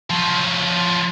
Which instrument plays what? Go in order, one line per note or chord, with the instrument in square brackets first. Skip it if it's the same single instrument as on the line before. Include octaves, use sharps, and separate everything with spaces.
[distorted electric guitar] F3 F#3